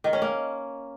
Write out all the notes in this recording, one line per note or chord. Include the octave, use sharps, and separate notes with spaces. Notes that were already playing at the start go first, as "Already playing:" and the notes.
D#3
C#4
A#3